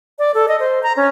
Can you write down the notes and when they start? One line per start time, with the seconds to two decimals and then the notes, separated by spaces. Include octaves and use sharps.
0.19 D5
0.34 A4
0.48 D#5
0.60 C5
0.83 A#5
0.97 C#4